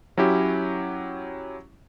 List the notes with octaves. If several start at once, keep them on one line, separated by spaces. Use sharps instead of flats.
F#3 C#4 E4 G4